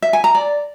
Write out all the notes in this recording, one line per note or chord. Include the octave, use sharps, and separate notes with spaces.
E5
G#5
A#5
D5